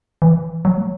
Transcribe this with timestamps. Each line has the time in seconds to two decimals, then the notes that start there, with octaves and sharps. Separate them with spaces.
0.22 E3
0.65 F#3
0.78 A3